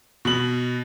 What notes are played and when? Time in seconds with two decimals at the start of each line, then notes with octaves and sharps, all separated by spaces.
0.25 B2 F#7